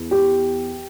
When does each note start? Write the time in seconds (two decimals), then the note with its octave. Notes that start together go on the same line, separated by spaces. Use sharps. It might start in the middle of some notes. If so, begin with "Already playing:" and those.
Already playing: E2
0.11 G4